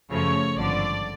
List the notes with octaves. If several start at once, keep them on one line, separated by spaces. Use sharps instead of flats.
F#2 C#3 F3 A3 C#5
G#1 G2 D3 F3 D5